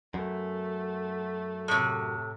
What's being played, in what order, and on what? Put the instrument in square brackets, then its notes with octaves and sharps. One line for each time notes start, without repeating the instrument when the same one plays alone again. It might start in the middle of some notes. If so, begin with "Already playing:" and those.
[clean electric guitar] F#2 [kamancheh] A3
[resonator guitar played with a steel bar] A2 C3